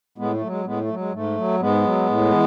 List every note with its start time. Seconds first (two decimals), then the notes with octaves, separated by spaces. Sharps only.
0.18 A2 G#3 B3
0.34 A3
0.42 F#3
0.49 G#3
0.65 A2 G#3 B3
0.81 A3
0.89 F#3
0.97 G#3
1.12 G#2 A3
1.37 F#3
1.60 G#2 G#3 B3
1.83 F#3
2.07 A2
2.31 E3